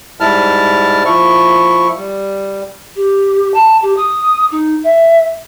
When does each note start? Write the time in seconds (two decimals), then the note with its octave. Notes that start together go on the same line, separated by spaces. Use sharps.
0.20 G#2 G3 E4 A5 F6
1.06 F3 E4 C#6
1.97 G3
2.96 G4
3.54 A5
3.82 G4
3.97 D#6
4.51 D#4
4.84 E5